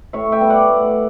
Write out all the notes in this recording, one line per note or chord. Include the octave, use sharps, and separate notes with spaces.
A2 C#5 E5
E5 G5
G3 B3
D5 F#5
A2